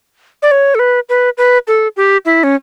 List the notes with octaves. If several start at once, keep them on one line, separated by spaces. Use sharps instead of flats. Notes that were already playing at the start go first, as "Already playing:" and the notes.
D5
C#5
A4
B4
B4
B4
A4
G4
E4
C#4